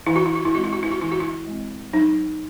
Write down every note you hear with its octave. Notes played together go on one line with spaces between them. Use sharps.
E3 E4
F#4
E4
F#4
E4
G#3 C4 F#4
E4
F#4
E4
F#4
E3 E4
F#4
E4
G#3 C4
F#3 D#4